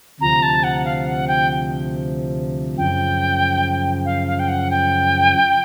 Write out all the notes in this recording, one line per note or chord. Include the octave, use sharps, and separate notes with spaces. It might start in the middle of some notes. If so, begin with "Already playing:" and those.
D2 C3 F3 A#5
A5
F#5
F5
F#5
G5
F#2 C#3 F3 G5
F5
F5
G5
F#5
G5